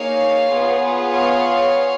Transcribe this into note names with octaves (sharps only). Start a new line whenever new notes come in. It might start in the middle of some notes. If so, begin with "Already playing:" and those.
Already playing: A#3 D#4 G#4 C#5 F5
B3 F4 G#4
C#5 F5